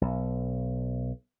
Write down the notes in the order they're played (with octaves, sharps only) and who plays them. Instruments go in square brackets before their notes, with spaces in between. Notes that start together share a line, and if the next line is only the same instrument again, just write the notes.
[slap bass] B1